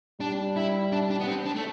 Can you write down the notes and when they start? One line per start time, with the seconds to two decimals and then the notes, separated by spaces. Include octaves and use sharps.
0.20 G3 D4
0.56 E4
0.92 D4
1.11 D4
1.21 B3
1.28 C4
1.46 D4
1.56 A3